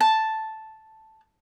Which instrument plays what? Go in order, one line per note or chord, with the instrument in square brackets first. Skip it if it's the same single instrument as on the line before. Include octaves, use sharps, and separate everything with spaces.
[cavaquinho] A5